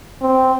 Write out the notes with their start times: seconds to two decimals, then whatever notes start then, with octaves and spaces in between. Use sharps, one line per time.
0.22 C4